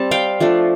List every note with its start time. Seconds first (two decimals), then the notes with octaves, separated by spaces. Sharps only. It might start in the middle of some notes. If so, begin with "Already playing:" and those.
Already playing: G3 C4 A5
0.11 F5 G5
0.40 F3 A3 D4